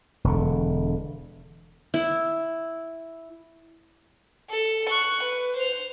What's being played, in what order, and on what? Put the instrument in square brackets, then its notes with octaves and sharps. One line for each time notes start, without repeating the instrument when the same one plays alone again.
[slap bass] E1 D3
[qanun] E4
[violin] A4
C#6 F#6
B4
C5 F7